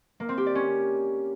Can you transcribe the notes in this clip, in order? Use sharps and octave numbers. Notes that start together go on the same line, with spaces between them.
A#3
C4
G4
D5
C#4